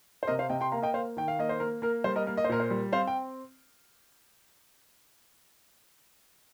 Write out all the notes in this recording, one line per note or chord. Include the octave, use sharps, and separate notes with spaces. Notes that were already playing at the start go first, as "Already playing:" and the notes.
C5
C3 A#4 D#5
C5 F5
C3 D#5 G5
G5 C6
A#3 F5 A#5
D#5 G5
A#3 C5 F5
D#3 G5
F5
A#3 D#5
C5
A#3 A#4
A#3 A#4
G3 C5
A#4 D#5
A#3 A#4
D#5
C5
A#2 A#4
C5
G3
C4 C5 F5
G5